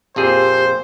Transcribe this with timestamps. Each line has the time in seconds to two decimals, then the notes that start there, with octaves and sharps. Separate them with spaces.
0.16 A#1 F2 G4 G#4 C5